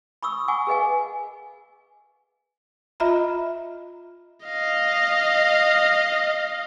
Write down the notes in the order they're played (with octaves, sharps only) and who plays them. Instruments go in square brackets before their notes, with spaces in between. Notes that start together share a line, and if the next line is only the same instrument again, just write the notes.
[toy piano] B5 C#6 D#6 E6
F#5 G#5 C#6 D6
G#4 A#4 B4 D#5 F5 G#5
[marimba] F4 D#5 E5 A#5 B5
[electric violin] D#5 F5